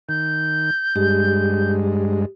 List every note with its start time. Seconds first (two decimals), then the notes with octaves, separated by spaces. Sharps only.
0.09 D#3 G6
0.96 G2 G#3 G4